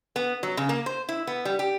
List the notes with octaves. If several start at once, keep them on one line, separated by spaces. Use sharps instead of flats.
B3
F#3
C#3
A#3
C5
E4
B3
G3
G4